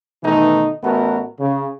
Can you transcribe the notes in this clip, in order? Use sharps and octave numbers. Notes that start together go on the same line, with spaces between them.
B2 D#3 E3 A3 D#4
A1 A3 B3 F#4 A#4
C#3